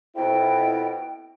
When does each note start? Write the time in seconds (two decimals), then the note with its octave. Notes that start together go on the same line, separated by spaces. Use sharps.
0.16 F2 B2 E4 G5